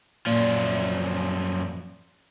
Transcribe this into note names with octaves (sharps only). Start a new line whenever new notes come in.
F#2 A#2 F3